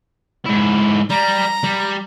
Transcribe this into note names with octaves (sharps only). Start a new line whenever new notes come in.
G#2 E4
G3 A#5
G3